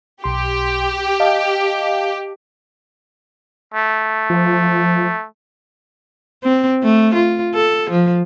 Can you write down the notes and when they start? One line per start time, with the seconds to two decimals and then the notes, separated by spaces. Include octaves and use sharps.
0.24 B1 G4 C6
1.20 D#5 F5 A5
3.74 A3
4.30 F3
6.44 C4
6.83 A3
7.14 F4
7.55 A4
7.90 F3